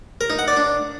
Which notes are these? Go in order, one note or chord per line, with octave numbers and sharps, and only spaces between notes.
A#4
D#4
F#5
D5
D4